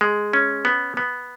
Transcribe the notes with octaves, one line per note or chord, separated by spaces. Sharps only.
G#3
C#4
B3
B3